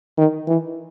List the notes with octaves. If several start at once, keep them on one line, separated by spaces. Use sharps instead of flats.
D#3
E3